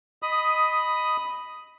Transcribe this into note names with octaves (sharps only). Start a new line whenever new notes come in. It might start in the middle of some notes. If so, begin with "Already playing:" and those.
D#5 B5 D#6